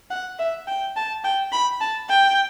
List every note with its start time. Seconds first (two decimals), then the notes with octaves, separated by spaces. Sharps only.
0.10 F#5
0.39 E5
0.67 G5
0.96 A5
1.24 G5
1.52 B5
1.81 A5
2.09 G5